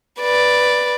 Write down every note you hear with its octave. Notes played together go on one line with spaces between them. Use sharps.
B4 D5